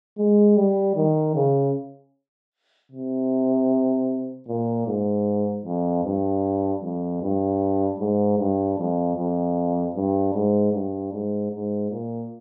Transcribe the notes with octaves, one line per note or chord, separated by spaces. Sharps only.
G#3
G3
D#3
C#3
C3
A#2
G#2
F2
G2
F2
G2
G#2
G2
F2
F2
G2
G#2
G2
G#2
G#2
A#2